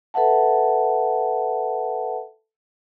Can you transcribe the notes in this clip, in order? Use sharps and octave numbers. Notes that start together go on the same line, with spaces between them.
A4 B4 E5 F#5 A5